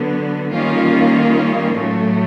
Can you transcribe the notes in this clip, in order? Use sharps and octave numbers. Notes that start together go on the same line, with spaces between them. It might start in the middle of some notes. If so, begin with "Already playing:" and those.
Already playing: D3 F#3 B3
D#3 G3 A#3 C#4 F4
A2 F#3 A3